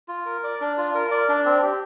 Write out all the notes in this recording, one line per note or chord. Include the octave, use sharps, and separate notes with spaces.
F4
A#4
D5
D4
F4
A#4
D5
D4
C4
G4